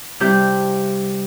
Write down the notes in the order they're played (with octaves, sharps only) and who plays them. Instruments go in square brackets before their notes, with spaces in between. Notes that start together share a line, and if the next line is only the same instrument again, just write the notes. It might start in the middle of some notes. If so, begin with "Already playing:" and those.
[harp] C3 G3 E4 G6